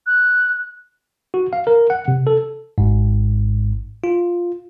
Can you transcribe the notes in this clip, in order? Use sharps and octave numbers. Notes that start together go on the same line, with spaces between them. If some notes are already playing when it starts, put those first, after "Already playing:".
F#6
F#4
F5
A#4
F#5
C3
A4
G#1 G#2
F4